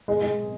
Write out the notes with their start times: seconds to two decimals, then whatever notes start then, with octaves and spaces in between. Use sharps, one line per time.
0.08 G#3
0.21 G#3